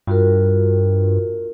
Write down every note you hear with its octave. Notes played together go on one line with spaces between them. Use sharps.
G2 F4 F#4 A#4